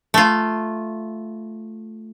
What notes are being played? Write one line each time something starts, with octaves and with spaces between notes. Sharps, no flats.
A3 F4